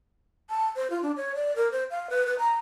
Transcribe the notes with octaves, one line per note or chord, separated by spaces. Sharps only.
A5
C5
F4
D4
C#5
D5
A#4
C5
F5
B4
B4
A#5